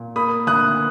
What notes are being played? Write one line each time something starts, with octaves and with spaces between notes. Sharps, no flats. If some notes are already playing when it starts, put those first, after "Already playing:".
Already playing: A#2
A#3 B5 D#6
D2 D#6 F#6